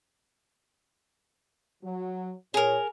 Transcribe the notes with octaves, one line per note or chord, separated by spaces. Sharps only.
F#3
A#2 G#4 A#4 C#5